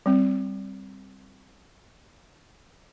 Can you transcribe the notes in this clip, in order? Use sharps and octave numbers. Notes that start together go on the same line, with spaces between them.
G3 C4